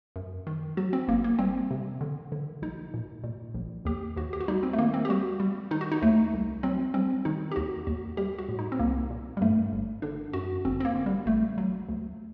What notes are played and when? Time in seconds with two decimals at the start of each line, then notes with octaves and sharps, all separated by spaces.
0.16 F#2
0.47 D#3
0.77 F#3 F#4
0.93 C4
1.08 G1 A#3
1.24 A#3
1.39 G3 C4
1.71 C3
2.01 D3
2.32 D3
2.62 A#1 D#4
2.94 A#2
3.24 A#2
3.55 A#1
3.85 D#2 G4
4.16 D#2 F#4
4.33 G4
4.40 F#4
4.48 G3 D#4
4.63 C4
4.73 A3
4.79 D#3 A#3
4.94 C4
5.05 G4
5.09 G3 F#4
5.40 G3
5.71 D#3 D#4
5.81 F#4
5.92 D#4
6.02 D#2 A3
6.33 C2
6.63 F#3 C4
6.94 G3 C4
7.25 D#3 D#4
7.52 G4
7.56 D#2 F#4
7.87 D#2 F#4
8.17 G3 G4
8.38 F#4
8.49 A2
8.59 D#4
8.72 C4
8.79 C2 A#3
9.10 A#2
9.37 G3
9.41 G2 A3
9.73 G1
10.02 D3 D4
10.33 F#2 F#4
10.65 G1 C4
10.80 C4
10.85 A#3
10.95 D3
11.06 G3
11.26 A1 A3
11.58 F#3
11.89 D2